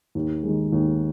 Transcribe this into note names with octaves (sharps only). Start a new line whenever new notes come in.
D#2
G#3
D#3
D#2